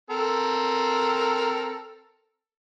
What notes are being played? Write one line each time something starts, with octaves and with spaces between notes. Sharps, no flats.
C4 A4 A#4